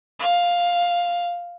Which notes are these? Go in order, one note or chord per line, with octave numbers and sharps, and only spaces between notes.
F5